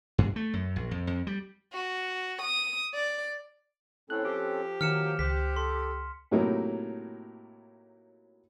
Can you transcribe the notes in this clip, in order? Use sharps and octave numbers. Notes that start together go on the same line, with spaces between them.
G2
A3
F#2
A#1
F2
F2
G3
F#4
D#6
D5
A2 C4 C#4 A4 F#6
F3 G4
D#3 F#3 A#3 F6 C#7 E7
C#2 G4 C5 F#6 B6
A4 C6
A2 C3 F#3 A#3 D#4 E4